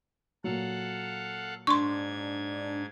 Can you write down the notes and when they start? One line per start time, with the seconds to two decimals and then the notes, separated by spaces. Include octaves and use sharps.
0.44 A#2 F#3 A4 F5 F#5
1.67 G#2 D4 C6 C#6 G#6